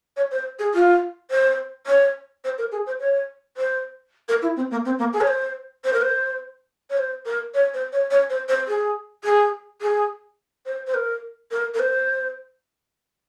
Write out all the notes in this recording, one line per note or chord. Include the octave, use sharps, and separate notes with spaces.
C#5
C5
G#4
F4
C5
C#5
C5
A#4
G#4
C5
C#5
C5
A#4
E4
C4
A#3
C4
A#3
G#4
C#5
C5
C5
A#4
C5
C#5
C5
A#4
C#5
C5
C#5
C#5
C5
C5
G#4
G#4
G#4
C5
C5
A#4
A#4
A#4
C5